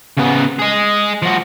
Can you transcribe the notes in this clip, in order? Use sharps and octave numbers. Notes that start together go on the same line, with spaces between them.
C#3 B3
G#4 D#5
F3 F#4